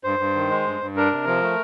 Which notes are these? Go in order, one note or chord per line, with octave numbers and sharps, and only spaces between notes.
G2 C5
G2
D#3
G#3
G2
G2
D4 A#4
C3
F3
A3